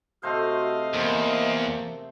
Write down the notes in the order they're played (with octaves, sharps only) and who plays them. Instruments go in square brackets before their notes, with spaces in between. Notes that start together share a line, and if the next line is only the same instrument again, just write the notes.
[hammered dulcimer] C3 A3 C5 [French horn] F#4 [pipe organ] D#5 F5
[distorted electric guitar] E2 [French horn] A#3 [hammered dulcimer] C5